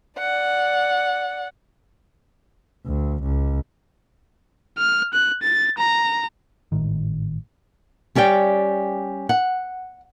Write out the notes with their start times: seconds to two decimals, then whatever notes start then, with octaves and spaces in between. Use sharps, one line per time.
0.18 D5 F#5
2.86 D2
3.23 C#2
4.78 F6
5.14 F#6
5.42 A6
5.78 A#5
6.72 G#1 A2 D#3
8.15 G3 C#4 G4 D5 G5
9.29 F#5